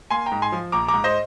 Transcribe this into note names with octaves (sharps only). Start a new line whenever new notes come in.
A#3 G#5 C6
G5 A#5
G#2
G#5 C6
F3
A#1 A#5 D6
A#5 D6
G#2
C5 D#5